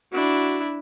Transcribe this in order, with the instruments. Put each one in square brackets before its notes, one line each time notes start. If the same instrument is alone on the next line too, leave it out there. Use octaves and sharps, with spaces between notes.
[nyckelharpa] D4 E4 [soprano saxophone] F#4